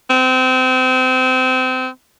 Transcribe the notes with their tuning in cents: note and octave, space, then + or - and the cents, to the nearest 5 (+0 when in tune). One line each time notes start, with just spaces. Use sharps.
C4 -25